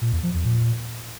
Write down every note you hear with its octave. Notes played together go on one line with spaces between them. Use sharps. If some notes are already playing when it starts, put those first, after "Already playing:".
A#2
E2
F3
E2
A#2